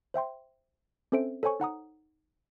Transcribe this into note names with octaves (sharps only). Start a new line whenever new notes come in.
C5 E5 G5 C6
C4 C#4 A4 C5 E5 D7
A4 C5 C#5 G#5 C#6
D#4 F#5 A#5 D#6